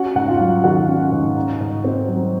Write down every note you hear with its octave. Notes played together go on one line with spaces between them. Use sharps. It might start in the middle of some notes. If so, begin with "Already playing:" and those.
Already playing: C#4 F#4 F#5
G#2 F#5
F4 F5
F#3
D#3 F#4 F#5
C#4
G#2
D#4
G#2
C4
F#3